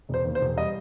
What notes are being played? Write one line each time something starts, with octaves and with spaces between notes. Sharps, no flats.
E1 C5
D#2
C5
E1
G3 D#5